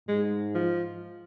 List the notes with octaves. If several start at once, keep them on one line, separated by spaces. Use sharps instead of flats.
G#2 G#3
F3